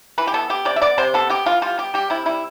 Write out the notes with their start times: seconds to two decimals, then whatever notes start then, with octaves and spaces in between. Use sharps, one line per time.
0.18 E3 B4
0.27 G4
0.34 B3 A4
0.50 B3 G4
0.65 C3 D5
0.76 E5
0.82 B3 D5
0.98 C3 C5
1.14 B3 A4
1.30 B3 G4
1.46 E3 F4
1.62 G3 F4
1.78 B3 G4
1.94 G3 G4
2.10 C3 E4
2.26 G3 E4